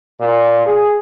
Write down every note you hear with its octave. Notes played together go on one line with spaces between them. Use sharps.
A#2
G#4